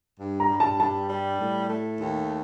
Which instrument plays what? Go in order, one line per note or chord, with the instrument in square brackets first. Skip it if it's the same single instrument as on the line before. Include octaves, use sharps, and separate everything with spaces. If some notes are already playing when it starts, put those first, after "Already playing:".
[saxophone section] G2
[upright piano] A#5
[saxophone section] G3
[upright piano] A5
[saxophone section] G2 [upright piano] A5
[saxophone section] G3
A2
A3
D#2